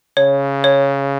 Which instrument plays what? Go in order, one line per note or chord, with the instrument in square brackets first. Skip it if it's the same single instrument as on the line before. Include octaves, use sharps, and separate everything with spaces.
[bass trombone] C#3 [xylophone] C#5
[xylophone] C#5